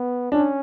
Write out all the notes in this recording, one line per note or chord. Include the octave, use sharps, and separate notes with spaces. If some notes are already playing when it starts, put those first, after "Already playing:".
Already playing: B3
C#4 D4